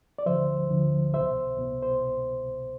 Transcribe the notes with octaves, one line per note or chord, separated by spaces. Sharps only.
D5
D2 D3 F3 C5 E5
D2 D3 F3
C2 B2 C5 E5
C2 B2
C5